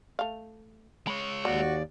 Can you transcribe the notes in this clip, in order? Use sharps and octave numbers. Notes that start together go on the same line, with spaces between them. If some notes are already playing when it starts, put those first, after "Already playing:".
A3 F5
G#3 C#5 B5
D#2 A#3 F#4 D5